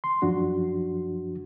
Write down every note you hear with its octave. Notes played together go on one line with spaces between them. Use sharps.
C6
F#2 F3 D4 F#4